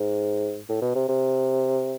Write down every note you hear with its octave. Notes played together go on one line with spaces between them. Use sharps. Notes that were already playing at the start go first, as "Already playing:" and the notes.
Already playing: G#2
A2
B2
C3
C3